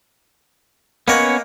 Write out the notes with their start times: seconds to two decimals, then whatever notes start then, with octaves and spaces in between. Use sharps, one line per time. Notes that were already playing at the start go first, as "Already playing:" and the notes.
1.08 A#3 B3 C#4 C#5 D#5 F#5